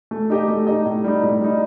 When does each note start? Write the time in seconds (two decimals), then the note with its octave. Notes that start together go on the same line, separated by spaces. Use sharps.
0.11 A3
0.30 D#4 G4 D#5
0.48 A3
0.67 D#4 G4 D#5
0.85 A2
1.04 G3 D#4
1.22 A2
1.41 G3 D#4